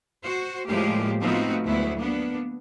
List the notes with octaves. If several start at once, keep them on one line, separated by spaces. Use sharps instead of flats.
F#4 C5
A2 F3 G3 G#3 A#3 G4
F3 A3 B3 C4 D#4 F#4
D2 F#3 G#3 B3 E4
A#3 B3 D4